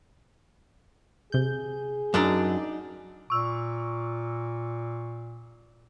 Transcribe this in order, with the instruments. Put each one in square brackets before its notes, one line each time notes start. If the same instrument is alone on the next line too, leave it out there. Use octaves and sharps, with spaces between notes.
[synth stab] C3 G6 [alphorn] G#4
[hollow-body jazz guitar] F#2 [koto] D4 D#4 D5
[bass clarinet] A#2 [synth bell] C#6 E6